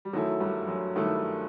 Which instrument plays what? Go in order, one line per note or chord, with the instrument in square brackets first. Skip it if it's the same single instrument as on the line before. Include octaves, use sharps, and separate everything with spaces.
[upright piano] G3
[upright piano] F#2 F#3 [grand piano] D#3 A3 E4 A4
[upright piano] G2 G3
F#2 F#3
[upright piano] G2 G3 [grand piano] D#3 A3 E4 A4